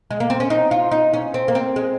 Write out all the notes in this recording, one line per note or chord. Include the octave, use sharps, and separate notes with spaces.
G#3
A#3
C4
C#4
D#4
F4
D#4
C#4
C4
A#3
C4
G#3